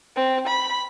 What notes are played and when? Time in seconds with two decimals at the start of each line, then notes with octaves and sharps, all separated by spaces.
0.16 C4
0.47 B5